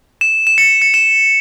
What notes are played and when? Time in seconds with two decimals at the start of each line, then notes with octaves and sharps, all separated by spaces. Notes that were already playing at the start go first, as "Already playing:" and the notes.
0.21 E7
0.47 E7
0.58 C#7
0.82 C#7
0.94 E7